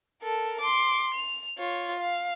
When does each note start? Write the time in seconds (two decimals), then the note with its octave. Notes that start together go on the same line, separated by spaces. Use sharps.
0.23 A4 A#4
0.60 C6 D6
1.15 F7
1.58 F4 C#5
2.00 F5